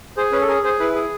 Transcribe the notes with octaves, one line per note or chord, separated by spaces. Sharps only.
G#4 C5
C#4 B4
A4
G#4 A#4
G#4 C5
E4 B4
G#4